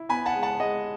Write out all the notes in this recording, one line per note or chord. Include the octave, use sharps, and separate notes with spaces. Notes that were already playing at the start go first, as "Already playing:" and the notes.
Already playing: E4
B3 G#5 B5
F#5 A5
G#3
F#5 A5
G#3 D#5 F#5